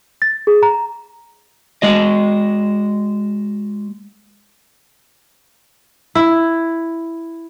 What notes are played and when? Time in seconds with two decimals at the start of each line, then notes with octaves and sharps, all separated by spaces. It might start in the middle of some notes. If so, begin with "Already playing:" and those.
0.22 A6
0.47 G#4
0.63 A#5
1.82 G#3 F#4 D#5
6.15 E4